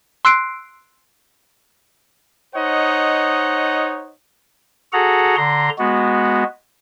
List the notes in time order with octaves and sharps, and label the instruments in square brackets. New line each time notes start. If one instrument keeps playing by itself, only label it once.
[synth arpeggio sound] C6 E6 F#6 C7 D7
[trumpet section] D#4 C5 C#5 D#5 F#5
[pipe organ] F#4 G#4 A4 F#5 A#5
D3 A#5 C6
G#3 B3 F#4